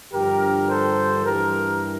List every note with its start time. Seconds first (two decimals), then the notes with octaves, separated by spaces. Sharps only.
0.13 G2 D3 F3 G4 A#4
0.69 A4 C5
1.24 G2 E3 G4 A#4